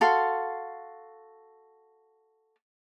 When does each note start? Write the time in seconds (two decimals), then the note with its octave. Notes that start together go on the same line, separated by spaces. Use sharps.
0.01 F#4 A4 F5 C6